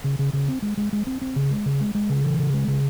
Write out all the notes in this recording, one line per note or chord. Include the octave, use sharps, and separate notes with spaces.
C#3
C#3
C#3
C4
G#3
G#3
G#3
C4
C4
C#3
G#3
C#3
G#3
G#3
C#3
E3
C#3
G#3
C#3